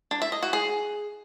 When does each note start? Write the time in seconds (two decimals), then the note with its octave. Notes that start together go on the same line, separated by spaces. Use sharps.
0.11 D4
0.22 E5
0.32 D#5
0.43 F#4
0.53 G#4